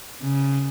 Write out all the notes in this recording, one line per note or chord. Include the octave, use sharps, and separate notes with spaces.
C#3